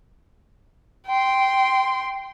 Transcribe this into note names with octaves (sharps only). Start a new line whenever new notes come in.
G5 C6